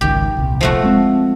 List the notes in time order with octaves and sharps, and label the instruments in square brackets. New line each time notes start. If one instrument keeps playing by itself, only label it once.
[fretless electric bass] G#1 C#2 D#3 [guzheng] G4
[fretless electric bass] D#1 C2
[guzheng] F3 A3 F#4
[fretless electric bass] G#3 C4